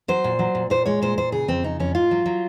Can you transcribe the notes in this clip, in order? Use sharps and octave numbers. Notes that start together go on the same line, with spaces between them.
F#3 C5
A#2
F#3
A#2
A#2 C5
G#3 C#5
A#2 C5
A#2 C5
C#3 G#4
F2 C4
C#3 D#4
F2 C#4
G#2 F4
F#3
F#3